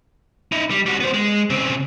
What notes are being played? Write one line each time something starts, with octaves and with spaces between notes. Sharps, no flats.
D#4 E4
G3
G3 F#4
B3 C5
G#3
C#3 C4